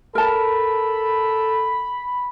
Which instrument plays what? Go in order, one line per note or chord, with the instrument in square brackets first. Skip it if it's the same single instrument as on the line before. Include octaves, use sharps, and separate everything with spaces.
[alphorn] A4 [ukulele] A#4 A5 [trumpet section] B5